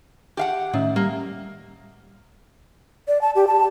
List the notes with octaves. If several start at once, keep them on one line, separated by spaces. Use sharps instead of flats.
G4 F5 F#5
A2 D#3 C#4 E5
G3 A#3
D5
A5
G4
A5